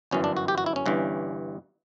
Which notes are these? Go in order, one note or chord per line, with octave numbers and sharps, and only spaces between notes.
G1 F#2 E3 C#4
D4
F#4
G4
F#4
E4
C#4
G1 G2 E3